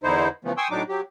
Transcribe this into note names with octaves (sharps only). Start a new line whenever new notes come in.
E2 D3 D#4 E4 C5
C#3 E3 F3 A3 B3
G5 G#5 C6 C#6 D#6 E6
A2 F#3 D4 D#4 D6
F#3 G4